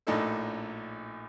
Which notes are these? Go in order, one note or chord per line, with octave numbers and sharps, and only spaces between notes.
A#1 A2 D4 D#4 A4